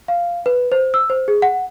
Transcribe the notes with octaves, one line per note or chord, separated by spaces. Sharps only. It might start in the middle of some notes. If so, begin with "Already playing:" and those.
F5
B4
C5
E6
C5
G#4
F#5